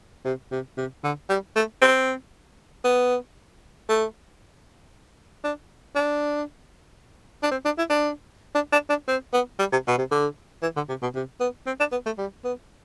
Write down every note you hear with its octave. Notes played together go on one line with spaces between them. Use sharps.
C3
C3
C3
D3
G3
A3
C4
B3
A3
D4
D4
D4
C4
D4
E4
D4
D4
D4
D4
C4
B3
G3
C3
B2
C3
D3
E3
D3
C3
B2
C3
B3
C4
D4
B3
A3
G3
B3